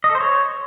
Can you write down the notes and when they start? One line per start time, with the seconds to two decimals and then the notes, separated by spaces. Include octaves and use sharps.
0.04 D#5
0.09 A4
0.15 C5
0.20 C#5